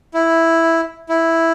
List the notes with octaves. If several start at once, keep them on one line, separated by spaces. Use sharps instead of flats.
E4
E4